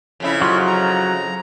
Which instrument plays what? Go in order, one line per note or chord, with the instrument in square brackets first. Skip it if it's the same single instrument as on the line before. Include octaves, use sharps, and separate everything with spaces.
[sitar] F2 C#3 E4
[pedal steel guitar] F#3 C#6 [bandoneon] F4
[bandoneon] A#5